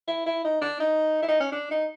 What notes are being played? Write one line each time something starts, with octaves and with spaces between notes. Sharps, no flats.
E4
E4
D#4
D4
D#4
E4
D#4
C#4
D4
D#4